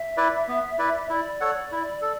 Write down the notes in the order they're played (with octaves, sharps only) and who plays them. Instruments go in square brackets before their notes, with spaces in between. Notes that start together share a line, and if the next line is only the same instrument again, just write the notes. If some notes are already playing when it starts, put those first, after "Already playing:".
Already playing: [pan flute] E5
[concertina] E4 B4 D5
B3
E4 B4 D5
[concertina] E4 [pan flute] D5
[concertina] A4 C#5 F#5
E4
A4